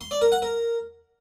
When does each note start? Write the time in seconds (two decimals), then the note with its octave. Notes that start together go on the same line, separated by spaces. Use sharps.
0.01 C6
0.11 D5
0.21 A#4
0.32 F#5
0.42 A#4